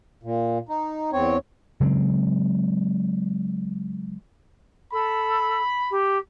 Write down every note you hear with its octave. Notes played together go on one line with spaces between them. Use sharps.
A#2
D#4
E2 C4 C#5
C#3 F#3 G#3 C4
A4 B5
G4